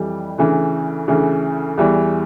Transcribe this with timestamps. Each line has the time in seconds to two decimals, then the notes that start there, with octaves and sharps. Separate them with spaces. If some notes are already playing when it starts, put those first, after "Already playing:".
Already playing: F2 E3 G3
0.38 D2 C#3 E3
1.08 D2 C#3 E3
1.78 E2 E3 G3